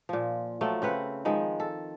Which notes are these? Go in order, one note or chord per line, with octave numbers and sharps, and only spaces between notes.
A#2 F3
F3 F#3 A3
C#3 C4 B4 F#5
D#3 F3 G#3
A4